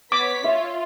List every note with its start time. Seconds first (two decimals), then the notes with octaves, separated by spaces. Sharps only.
0.12 B3 C#5 D6 B6
0.44 F4 E5